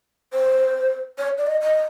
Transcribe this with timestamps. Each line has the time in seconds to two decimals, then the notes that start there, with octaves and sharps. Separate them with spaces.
0.33 C5
1.18 C#5
1.38 D5
1.47 D#5
1.61 D#5